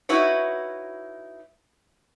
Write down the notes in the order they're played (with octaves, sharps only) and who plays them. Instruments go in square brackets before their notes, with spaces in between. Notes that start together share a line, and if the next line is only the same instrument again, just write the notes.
[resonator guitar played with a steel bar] D#4 E4 F#4 B4 C#5